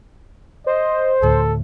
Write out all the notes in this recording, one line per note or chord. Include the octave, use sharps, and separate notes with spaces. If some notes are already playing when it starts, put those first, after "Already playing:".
C5 D#5
D2 A2 A4